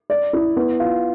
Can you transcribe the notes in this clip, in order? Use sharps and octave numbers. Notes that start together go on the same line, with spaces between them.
D5
E4
B3
F4